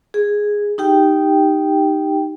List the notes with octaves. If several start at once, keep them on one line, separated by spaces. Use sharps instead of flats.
G#4
D#4 G4 G5